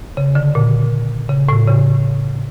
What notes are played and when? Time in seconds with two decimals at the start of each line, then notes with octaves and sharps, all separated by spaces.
0.17 C#3
0.35 D3
0.55 A#2
1.29 C#3
1.49 A2
1.68 C#3